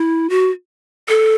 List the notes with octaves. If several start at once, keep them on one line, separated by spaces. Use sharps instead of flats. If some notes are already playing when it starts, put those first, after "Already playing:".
Already playing: E4
F#4
A4